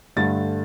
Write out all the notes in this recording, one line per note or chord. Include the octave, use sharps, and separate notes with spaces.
G2 D3 A3 A6